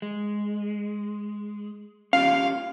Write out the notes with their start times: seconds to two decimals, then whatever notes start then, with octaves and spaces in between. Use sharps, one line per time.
0.02 G#3
2.13 C#4 F4 G4 F5